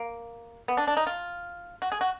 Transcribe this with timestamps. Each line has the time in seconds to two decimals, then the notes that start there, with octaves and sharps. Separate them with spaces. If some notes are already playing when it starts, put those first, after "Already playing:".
Already playing: A#3
0.68 B3
0.77 D4
0.87 D4
0.97 D#4
1.07 F4
1.82 F#4
1.92 G#4
2.01 F#4